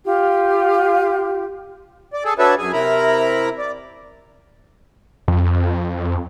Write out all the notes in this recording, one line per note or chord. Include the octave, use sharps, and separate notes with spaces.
F4 G4
D5
G#4 A4
D4 F#4 A4 B4 C#5 E5
F#2 G#4 G#5
C3 E4 A#4 A#5 B5
D5
F2